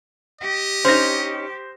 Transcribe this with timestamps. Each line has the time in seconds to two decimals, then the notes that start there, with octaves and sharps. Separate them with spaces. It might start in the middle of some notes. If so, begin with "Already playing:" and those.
0.41 G4 D#5
0.85 C#4 D#4 C5 A#6